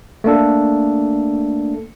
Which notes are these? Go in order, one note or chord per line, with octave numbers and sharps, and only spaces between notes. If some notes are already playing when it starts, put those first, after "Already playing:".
A3 A#3 D4 A4